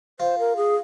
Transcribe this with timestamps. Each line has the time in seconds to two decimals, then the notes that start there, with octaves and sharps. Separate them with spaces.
0.20 F4 C5
0.39 A#4
0.57 G#4